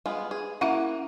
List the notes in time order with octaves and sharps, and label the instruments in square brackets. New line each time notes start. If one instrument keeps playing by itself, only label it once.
[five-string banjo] G#3 B3 F4
G#4
[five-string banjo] A#3 F#4 F#5 [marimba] C#4 E4 E5